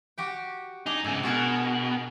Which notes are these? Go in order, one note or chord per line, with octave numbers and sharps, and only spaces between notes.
F#4 G4 G5
D4 D#4 G#4
G#2 C#3 A4
B2 F#4 G#4 A#4